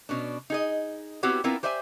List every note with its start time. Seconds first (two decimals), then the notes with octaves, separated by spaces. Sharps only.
0.09 B2 C#4 D4
0.50 D#4 G#4 D#5
1.23 B3 C4 E4 F#4 G4 C#5
1.44 B3 C4 D4 E4 F4 A#4
1.63 G4 C5 D5 E5 G5 G#5